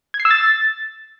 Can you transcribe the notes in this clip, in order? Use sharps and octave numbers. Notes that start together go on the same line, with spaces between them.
G#6
C7
E6
A6